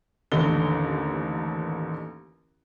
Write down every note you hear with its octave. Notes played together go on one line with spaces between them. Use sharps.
A1 D#2 D3 G7